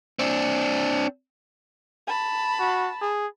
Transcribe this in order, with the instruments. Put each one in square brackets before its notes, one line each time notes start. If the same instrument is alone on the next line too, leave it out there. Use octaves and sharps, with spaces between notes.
[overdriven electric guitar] C4 D4
[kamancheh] A5 B5
[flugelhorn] F#4
G#4